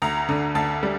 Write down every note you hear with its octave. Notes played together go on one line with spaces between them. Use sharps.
D2 A#5
D3
D2 A5
G3